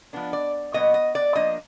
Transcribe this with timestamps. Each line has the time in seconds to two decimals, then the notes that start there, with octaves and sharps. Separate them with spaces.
0.13 F3 B3 D4
0.33 D5
0.73 A#2 F#3 B3 D#5
0.94 D#5
1.15 D5
1.35 F3 A#3 D4 D#5